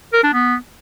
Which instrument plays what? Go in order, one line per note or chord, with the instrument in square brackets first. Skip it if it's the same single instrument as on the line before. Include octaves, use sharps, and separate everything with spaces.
[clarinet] A#4
D4
B3